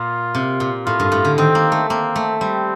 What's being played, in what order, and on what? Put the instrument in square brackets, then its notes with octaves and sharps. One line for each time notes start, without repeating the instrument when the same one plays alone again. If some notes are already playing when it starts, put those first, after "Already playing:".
Already playing: [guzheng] A#2 [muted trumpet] F4
[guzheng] C3
A#2
[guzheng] A2 [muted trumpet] F4
[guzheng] G2
A2
D3
[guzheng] D#3 [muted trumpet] C4
[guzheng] A#3
A3
[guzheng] A#3 [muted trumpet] C4
[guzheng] A3
[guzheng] G3 [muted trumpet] C4